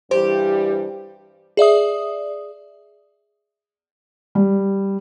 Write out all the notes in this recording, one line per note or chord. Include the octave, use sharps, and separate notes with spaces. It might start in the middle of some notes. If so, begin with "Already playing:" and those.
G2 E3 G3 G4 C5
G#4 D5 E5 D#6
G3